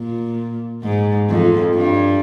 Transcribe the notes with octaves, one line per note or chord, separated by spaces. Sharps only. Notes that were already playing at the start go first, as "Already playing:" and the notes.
Already playing: A#2
G#2
F2
G2